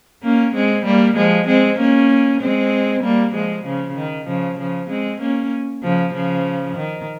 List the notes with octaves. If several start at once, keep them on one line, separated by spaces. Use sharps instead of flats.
A#3 C#4
G#3 C4
G3 A#3
F3 G#3
G#3 C4
A#3 C#4
G#3 C4
G3 A#3
F3 G#3
C#3 F3
D#3
C#3 F3
C#3 F3
G#3 C4
A#3 C#4
C#3 F3
C#3 F3
D#3